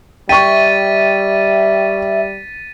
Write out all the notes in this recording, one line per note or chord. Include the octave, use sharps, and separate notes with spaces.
G3 E5 G5 C#6 A6 B6 D#7